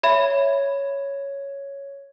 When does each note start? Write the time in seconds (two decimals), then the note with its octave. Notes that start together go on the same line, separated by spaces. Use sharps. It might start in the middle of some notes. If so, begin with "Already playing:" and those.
0.03 C#5 E5 B5 G#6